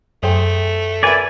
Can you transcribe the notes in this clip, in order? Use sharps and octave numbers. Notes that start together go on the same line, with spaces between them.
F#2 A3 G#4 C5 G5
A#4 B4 D5 E5 G#5 G#6